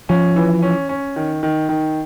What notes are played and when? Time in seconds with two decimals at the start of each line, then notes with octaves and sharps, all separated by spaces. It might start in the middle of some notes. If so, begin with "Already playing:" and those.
0.09 F3 C#4
0.36 E3
0.62 C#4
0.89 C#4
1.16 D#3
1.43 D#3
1.69 D#3